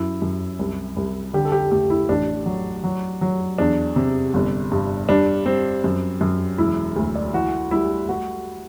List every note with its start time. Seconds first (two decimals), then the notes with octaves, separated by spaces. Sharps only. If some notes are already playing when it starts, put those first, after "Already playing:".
Already playing: F#2 E4
0.22 F#2
0.59 C2
0.96 C2
1.34 D3 G4
1.45 A4
1.52 G4
1.71 A3 G4
1.90 E4
2.09 A1 D4
2.46 F#3
2.83 F#3
3.21 F#3
3.58 E2 D4
3.96 C3
4.34 G1
4.72 G2
5.09 G3 D4
5.46 G3 C4
5.84 F#2
6.21 F#2
6.58 E1 E4
6.96 D2
7.15 D5
7.33 E3 F#4
7.71 G3 E4
8.08 A3 F#4